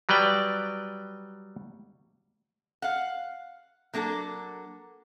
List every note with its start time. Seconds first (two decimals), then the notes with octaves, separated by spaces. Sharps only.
0.09 F#3 G3 B4 D5 G5
2.82 F5 F#5
3.94 F#3 A#3 D4 A4